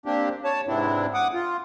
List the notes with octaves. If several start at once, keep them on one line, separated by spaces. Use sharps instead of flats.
A#3 C4 D4 G4
C#5 A5
G#2 C3 B3 C4 D4 E4
F#5 D6 D#6
F4